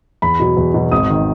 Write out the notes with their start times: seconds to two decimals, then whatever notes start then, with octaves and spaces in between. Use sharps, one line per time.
0.22 E2 B5
0.39 B2 F#3 B3
0.57 E2
0.74 B2 F#3 B3
0.92 G#1 D#6
1.09 D#3